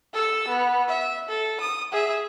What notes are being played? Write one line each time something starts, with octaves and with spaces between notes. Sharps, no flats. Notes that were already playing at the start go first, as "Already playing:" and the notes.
A4 E6
B3
E5
A4
D#6
G#4 E5